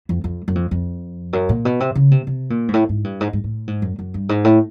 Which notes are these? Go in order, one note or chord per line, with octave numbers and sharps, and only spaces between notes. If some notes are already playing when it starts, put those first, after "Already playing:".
F2
F2
F#2
F2
F2
F#2
A#2
B2
C3
C#3
C3
C3
A#2
G#2
A2
G#2
G2
G#2
G#2
A2
G#2
F#2
F#2
G2
G#2
A2